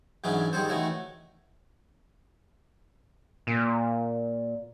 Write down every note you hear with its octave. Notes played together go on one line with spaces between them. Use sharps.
G#2 E3 F#3 C#4 D4 G#4
D#3 G3 G#4 A4 C5
D#3 E3 A3 F#4 C#5
A#2